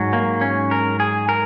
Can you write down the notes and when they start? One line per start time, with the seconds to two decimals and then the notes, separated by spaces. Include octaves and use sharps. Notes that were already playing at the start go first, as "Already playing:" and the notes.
Already playing: G#2 F#3
0.13 A#3
0.41 C#4
0.71 A#4
1.00 G#4
1.29 A#4